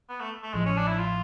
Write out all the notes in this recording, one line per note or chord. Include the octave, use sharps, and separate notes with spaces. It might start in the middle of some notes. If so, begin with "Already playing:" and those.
B3
A3
A3
A1 A2 F3 G#3
C#4
D4
E4
F4